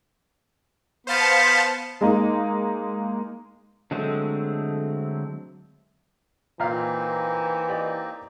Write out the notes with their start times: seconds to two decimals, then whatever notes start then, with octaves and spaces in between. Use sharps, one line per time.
1.07 B3 C5 F5 A5
2.01 G#3 A#3 D#4
3.91 D3 F#3 G#3 A3 C4
6.60 A#2 E3 A#3 C4 D#4 F5
7.68 G4 D5 D#5